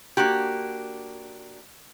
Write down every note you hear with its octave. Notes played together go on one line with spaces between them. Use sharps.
A#3 D4 F#4 G4